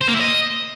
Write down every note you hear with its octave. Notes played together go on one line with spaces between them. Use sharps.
C5
A#3
E4
D#5